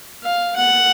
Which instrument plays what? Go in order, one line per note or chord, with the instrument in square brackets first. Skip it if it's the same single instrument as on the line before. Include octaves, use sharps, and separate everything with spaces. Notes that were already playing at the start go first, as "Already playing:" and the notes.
[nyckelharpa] F5
F#5